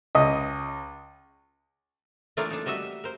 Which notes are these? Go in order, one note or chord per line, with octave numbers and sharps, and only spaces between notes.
C#2 D#5
E3 A3 A#3 D4 F4 A#4
D4 D#4
G3 F#4 D#5 E5
A#4 C5